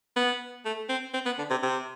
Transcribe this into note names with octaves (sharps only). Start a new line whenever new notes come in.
B3
A3
C4
C4
B3
D3
C3
C3